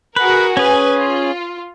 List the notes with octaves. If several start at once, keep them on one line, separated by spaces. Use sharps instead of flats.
F#4 G#4 A#4 B4
C#4 G#4 B4 G#5
F4